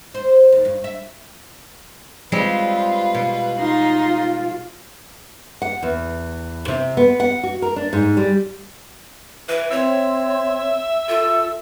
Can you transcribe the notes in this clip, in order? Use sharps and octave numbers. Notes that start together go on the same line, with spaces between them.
C5
D#2
G2
E5
G3 G#3 C4 F4 B4
B2
D#4 F4 C6
F#5
E2
C3
B3
F#5
F#4
A#4
D4
G#2
G3
E3 B4
C4 C#5 E5
F4 A4